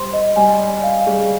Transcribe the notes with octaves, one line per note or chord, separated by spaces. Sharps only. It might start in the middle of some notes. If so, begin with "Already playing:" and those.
Already playing: G3 C5 C6
D#5
G3 G#5
D5
F5
G3 G#4